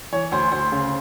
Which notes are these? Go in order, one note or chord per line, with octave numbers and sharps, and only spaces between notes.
E3 C#5
D2 C5
D2 C5
C#3